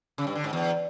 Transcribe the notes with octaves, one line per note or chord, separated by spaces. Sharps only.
C#3
G2
D3
G#2
E2